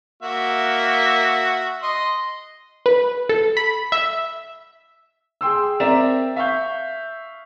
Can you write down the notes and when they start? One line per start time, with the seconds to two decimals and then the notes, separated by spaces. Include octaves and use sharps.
0.23 A#3 F#4 E5
1.83 D#5 C6
2.86 B4
3.29 A4
3.57 B5
3.92 E5
5.41 G#4 G5 C6 E6
5.80 C4 A#4 D5 E5 A#5 E7
6.36 E5 F5 C#6 G6